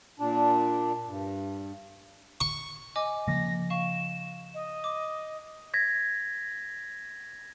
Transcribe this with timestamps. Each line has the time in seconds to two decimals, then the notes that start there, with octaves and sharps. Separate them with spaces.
0.20 A#2 D4
1.07 G2
2.41 C#6
2.96 D#5 G#5 D6
3.28 C#3 F3 A#3 A#6
3.70 F5 C#6 E7
4.54 D#5
4.84 D6
5.74 G#6 A#6 B6